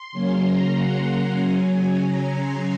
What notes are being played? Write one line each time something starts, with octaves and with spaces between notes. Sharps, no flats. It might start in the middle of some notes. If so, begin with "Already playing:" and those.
Already playing: C6
C#3 F#3 A#3 C#4
A#5
F#5
C#3 F#3 C#4 G#5
A#5
C6